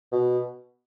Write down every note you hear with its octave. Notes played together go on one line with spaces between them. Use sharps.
B2